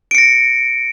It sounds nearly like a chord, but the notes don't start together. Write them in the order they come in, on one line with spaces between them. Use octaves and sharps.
D7 C#7 A#6